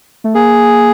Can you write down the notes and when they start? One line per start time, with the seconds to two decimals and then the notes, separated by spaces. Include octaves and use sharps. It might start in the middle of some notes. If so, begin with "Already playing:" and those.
0.24 A3
0.35 A#3 G#4